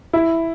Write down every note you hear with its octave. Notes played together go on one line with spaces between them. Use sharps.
E4